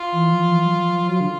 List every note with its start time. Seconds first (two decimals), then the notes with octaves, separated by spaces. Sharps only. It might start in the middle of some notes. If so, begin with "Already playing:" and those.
Already playing: F4
0.12 E3
0.31 F3
0.51 E3
0.66 F#3
0.70 F3
0.89 F3
1.02 F3
1.09 F#3 F4
1.20 D3